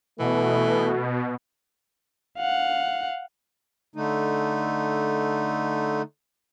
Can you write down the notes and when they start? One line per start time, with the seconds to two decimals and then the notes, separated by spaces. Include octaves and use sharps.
0.20 B2 E3 A3
2.38 F5 F#5
3.96 D3 A3 D#4